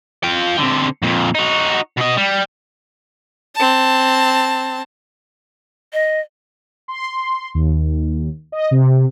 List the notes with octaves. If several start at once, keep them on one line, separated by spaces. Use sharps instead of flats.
F4 G5
D3 C4
F2 A#2
D#4 F#4
B2 D#5
G3
C4 A5
D#5
C6
D#2
D#5
C3